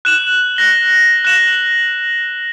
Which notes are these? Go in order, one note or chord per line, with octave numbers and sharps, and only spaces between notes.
F#6 E7 F#7
F#6 A#6 G7
F#6 E7 F#7